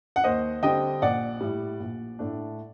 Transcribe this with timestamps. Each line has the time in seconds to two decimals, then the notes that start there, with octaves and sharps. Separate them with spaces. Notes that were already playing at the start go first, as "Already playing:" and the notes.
0.16 F#5
0.24 D#2 C5 D#5
0.63 D3 G3 C4 D#5 G5
1.02 A#1 D5 F#5
1.41 A2 G3
1.80 A#1
2.19 A2 A3 D4